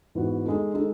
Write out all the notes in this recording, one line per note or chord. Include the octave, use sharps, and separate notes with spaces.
G#2 E3 B3 F#4
G#3 D#4 A4
G#3 D#4 A4